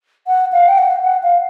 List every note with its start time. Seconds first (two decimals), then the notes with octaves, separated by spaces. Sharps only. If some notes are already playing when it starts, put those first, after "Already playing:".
0.27 F#5
0.53 F5
0.68 G5
0.78 F#5
1.04 F#5
1.23 F5